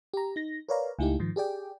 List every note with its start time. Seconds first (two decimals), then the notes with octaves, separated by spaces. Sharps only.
0.14 G4 A#5
0.36 D#4 A#6
0.69 A#4 B4 C#5 D5 F5 A#5
0.99 C#2 A3 D#4 E4 G4
1.19 G#2 D#3 F3
1.36 G4 G#4 D5 G5